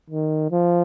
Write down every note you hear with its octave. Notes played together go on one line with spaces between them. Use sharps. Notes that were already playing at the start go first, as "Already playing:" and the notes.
D#3
F3